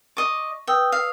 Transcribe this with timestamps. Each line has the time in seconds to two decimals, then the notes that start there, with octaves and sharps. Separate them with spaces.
0.17 D#5 C#6 D6
0.67 B4 G5 D#6 E6
0.92 F5